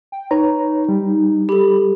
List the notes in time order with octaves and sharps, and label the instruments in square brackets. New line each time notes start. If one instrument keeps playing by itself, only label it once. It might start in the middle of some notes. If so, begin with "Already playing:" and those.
[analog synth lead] G5
[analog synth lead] D#4 [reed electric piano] B4 C#5 A#5
[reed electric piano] G3
[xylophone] G4 A4 [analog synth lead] B5